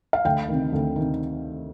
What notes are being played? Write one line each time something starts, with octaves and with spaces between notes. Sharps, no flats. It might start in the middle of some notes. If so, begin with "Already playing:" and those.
F5
D2 G5
C3 D#3
D2
C3 D#3